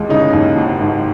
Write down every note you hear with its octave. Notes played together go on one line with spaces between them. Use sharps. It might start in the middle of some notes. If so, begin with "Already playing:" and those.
Already playing: D#2 G#3
C#3 D#4
D#2
G#1
G#2